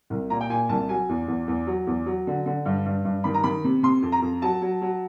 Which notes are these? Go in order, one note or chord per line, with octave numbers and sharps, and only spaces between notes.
C2
A#2 A#5
G5
A#2 G#5
C2 A5
F#3 G#5
E2
E2
E2
F#3
E2
F#3
D3
D3
G2
G2
G2
D#3 B5
A#5
D#3 B5
C3
C3 C6
F2
A#5
F2
F#3 A5
F#3
F#3